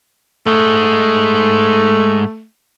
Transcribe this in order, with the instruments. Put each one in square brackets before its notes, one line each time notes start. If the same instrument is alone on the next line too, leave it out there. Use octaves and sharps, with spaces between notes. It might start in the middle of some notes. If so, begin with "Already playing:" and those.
[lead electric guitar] G#2 G#3 [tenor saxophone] A3